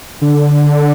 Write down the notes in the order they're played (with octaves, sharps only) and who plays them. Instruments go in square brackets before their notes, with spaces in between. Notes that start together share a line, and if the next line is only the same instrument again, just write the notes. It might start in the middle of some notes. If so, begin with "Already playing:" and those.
[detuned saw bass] D3